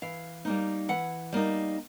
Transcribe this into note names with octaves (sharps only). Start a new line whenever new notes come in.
E3 F5
G3 A#3 D#4
E3 F#5
G3 A#3 D#4